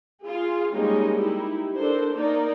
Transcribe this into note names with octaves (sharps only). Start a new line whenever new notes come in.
F4 G#4
G3 G#3 A#3 C#4 D#4 D#5
D#4 E4 G4
D4 A4 A#4 C5
A#3 D#4 A#4 D5